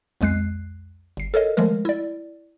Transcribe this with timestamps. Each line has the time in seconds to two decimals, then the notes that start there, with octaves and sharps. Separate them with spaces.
0.21 B1 F2 G#3 F#6 C7
1.17 G1 C7
1.34 A4 A#4 C#5 D#5
1.57 D#3 F3 G#3 A3 A#4
1.85 E4 D5